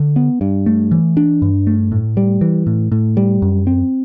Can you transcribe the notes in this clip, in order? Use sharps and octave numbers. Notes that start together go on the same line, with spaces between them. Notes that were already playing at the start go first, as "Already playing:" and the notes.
Already playing: D3
B3
G2
A3
E3
D4
G2
A3
A2
G3
E3
A2
A2
G3
F#2
C4